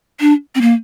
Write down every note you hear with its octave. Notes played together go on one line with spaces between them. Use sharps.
D4
C4
A#3